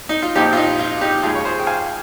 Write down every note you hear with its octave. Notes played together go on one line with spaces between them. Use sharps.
D#4
F4
A#1 A#2 F3 D#4 G4
F4
D#4
F4
D#4 G4
D#2 C#3 G#3 F4 G#4
C#5
G#4 C5
G5
F5 G#5